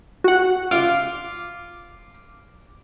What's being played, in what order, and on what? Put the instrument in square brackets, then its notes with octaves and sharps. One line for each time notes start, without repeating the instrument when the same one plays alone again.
[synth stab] F#4 F#5
[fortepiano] F4 [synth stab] D6